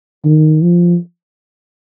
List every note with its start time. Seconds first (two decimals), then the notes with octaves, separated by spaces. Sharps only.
0.25 D#3
0.62 F3